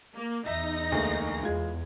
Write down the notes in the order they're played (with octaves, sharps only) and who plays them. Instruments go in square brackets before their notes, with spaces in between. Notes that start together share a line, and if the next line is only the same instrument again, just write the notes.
[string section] A#3
[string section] E2 D#4 A#6 [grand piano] E5
[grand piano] D2 G#3 A#3
[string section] E2 [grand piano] G#3 F4 G#6